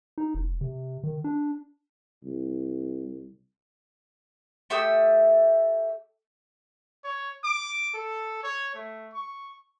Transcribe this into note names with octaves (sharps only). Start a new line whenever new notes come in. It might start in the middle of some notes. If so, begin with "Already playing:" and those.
D#4
F1
C3
D#3
D4
C2
A3 G4 D#6 E6
C#5
D6
A4
C#5
A3
C#6